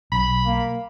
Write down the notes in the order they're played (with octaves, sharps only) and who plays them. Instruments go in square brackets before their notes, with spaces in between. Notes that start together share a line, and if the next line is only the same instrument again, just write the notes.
[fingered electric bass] B1 [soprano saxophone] B5
[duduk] A#3